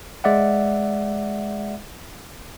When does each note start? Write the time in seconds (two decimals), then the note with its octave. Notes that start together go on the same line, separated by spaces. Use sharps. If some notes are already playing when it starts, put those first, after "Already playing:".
0.24 G#3 D5 E5 F#5